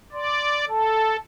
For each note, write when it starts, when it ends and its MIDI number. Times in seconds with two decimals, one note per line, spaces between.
0.13 0.65 74
0.13 0.60 84
0.68 1.17 69
0.68 1.16 81